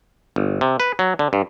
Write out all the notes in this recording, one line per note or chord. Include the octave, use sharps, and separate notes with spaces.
G1
C3
B4
F#3
D3
G2